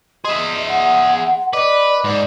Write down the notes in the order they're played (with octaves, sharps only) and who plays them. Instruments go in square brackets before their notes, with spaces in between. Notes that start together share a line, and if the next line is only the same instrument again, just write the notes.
[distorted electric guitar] G#4 E5 [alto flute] D#5 [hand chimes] C6
[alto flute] F#5
[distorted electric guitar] B4 [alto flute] D5 [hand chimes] D#5 D6
[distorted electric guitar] G#2 [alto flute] D5